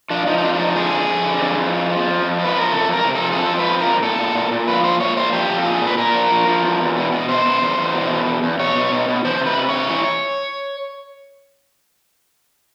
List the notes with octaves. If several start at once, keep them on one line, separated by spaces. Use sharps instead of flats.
F3 D4
F3 D#4
D#4
F2 D4
D4
F3 D#4
D3 G#4
F2
F2
D3
F2
F2
F3
F3
F2
F2
F3
B4
F2 A#4
C3 A4
F2 A#4
C3
A4
F3
G#4
F2 A4
F3
B4
F2
A#4
F2
A#2 A4
A#2
A#2
A#2
F3 B4
A#2 C5
A#2 C#5
A#2 C5
F3 G4
F3
A4
A#2 G#4
A#2
B4
A#2 A#4
F3
F3
F3
E2
E2
B2
B2
B2 C5
B2
E2
E2
B2
E2
E2
E2
B2 C#5
B2
B2
B2
E3 C5
C3
B4
C3
C3 C#5
E3